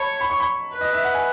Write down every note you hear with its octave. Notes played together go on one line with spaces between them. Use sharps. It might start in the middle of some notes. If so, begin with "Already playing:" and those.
Already playing: C#5 A5 B5
B5
C#6
B5
B4
D#5
E5
F#5
G#5